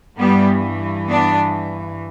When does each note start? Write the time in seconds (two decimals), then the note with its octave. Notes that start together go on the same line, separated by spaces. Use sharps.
0.18 G2 E3 G3 B3
1.09 B3 D4